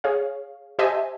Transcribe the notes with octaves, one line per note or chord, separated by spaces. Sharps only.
G#4 C#5 F5
G4 C5 D#5 E5 G#5 A5